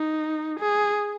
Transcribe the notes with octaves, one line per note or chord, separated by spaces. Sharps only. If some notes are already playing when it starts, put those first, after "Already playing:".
Already playing: D#4
G#4